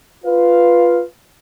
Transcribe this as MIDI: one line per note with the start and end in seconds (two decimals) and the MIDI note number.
0.25 1.01 65
0.25 1.01 71
0.25 1.01 77